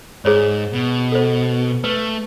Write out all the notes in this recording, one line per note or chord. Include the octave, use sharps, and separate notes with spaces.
G#2 G#4 C5 C#5
B2
A4 C5
A3 B4